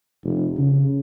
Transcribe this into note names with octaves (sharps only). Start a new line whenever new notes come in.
F1
C#3